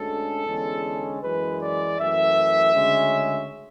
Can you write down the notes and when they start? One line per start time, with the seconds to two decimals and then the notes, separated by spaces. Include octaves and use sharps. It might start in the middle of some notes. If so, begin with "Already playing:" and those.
Already playing: D2 D3 G#3 C#4 A4
0.46 E2 D3 G#3 C#4
1.22 F#2 E3 G#3 B4
1.60 D5
1.98 F#2 E3 A3 E5
2.74 D2 C#3 G#3 C#4